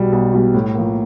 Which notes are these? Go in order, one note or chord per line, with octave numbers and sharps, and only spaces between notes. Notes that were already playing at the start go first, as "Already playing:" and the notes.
Already playing: B1 B2 G3
B1
B2 G3
A2
F3 A#3